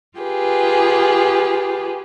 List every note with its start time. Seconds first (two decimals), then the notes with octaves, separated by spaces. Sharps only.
0.18 F4 G4 G#4 B4